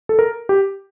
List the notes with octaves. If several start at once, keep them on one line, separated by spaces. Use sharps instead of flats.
A4
A#4
G4